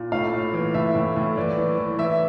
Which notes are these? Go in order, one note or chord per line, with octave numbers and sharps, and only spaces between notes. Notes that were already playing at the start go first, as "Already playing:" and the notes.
Already playing: A#2
A2 F5
A2
E3
A2 E5
A2
A2
E3 D5
E3
E3
E3 E5